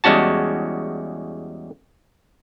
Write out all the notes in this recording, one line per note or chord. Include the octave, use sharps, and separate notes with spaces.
E2 G3 G#3 C#4 F#4 A5